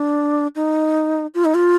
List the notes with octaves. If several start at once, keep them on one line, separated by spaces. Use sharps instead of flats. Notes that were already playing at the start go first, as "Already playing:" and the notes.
Already playing: D4
D#4
F4
D#4
F4